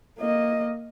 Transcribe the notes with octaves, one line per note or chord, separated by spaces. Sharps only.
A#3 D#5